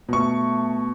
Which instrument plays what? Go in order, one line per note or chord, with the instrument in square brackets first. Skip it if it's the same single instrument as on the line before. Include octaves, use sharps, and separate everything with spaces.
[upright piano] B2 C#6 [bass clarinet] A3